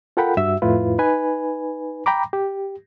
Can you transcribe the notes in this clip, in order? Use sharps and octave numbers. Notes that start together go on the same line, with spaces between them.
F4 A4 A#4 F#5 G5 B5
G2 F#4 E5 E6
F2 A2 E4 F4 B4
D#4 B4 G#5
G5 A#5 B5 D6
G4